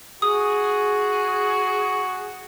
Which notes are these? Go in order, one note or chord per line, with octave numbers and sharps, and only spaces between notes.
F#4 G#4 D#6